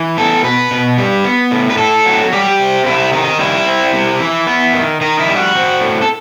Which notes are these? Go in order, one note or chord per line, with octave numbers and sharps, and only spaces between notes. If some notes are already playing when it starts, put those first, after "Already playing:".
Already playing: E3
B3 A4
B2 B4
B2
G3
B3
A2
B4
A2 A4
F#3
G3 G4
C4
C3 E4
D#3 D#4
G3 E4
C4
C3
E3
B3
D#3
D#3 D#4
E4
G3
F#4
C4
A2
A4